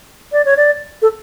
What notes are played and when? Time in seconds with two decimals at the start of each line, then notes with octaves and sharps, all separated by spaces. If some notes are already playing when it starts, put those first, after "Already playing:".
0.32 D5
0.45 C#5
0.57 D5
1.02 A4